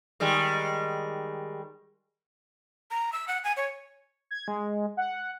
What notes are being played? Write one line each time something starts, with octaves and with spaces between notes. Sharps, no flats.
D#3 G3 G#3
A#5
E6
F#5
G#5
C#5
G#6
G#3
F#5